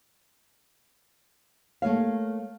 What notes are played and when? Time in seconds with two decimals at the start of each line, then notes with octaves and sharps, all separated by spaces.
1.82 A3 A#3 C#5 F5